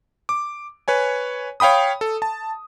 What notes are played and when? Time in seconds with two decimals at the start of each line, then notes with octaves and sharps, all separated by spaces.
0.29 D6
0.88 B4 C#5 G#5
1.60 C#5 F5 G5 B5 D#6
2.01 A4
2.22 A5